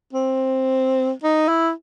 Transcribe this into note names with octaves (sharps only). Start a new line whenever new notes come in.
C4
D#4
E4